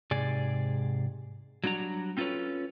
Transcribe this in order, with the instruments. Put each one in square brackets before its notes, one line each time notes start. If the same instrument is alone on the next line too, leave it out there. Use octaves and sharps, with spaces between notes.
[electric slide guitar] G#2 C3 G#4 D5 G#5
F#3 G3 D4 F#4 A#5
C4 C#4 F4 A4 B4 C#5